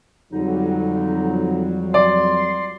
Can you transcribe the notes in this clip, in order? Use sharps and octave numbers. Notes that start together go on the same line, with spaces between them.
F2 D3 F#3 G3 D#4
D5 C6